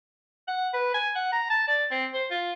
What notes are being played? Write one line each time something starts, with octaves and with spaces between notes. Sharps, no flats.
F#5
B4
G#5
F#5
A#5
A5
D5
C4
C5
F4